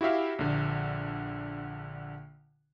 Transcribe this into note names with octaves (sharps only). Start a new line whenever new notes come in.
E4 F#4 G4 E5 F5
A#1 D3